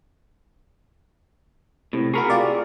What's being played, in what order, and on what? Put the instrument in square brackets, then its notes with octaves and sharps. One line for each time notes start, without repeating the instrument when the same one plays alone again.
[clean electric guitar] A2 [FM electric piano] C3
[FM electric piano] F#4 B5 C#6 [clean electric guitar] G#4 A#4
[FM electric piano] F4 G4 D5